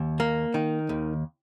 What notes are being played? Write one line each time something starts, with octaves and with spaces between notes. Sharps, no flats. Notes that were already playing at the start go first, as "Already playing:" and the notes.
Already playing: D#2
A#3
D#3
D#2